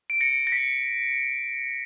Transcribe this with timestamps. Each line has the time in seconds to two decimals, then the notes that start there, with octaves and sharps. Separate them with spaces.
0.10 D7
0.21 A#6 C#7
0.47 A#6
0.52 B6